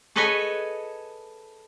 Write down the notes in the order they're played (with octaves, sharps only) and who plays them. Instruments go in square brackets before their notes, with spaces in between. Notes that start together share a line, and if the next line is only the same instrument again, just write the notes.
[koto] G#4 A4 B4 C#5 D#5 G#5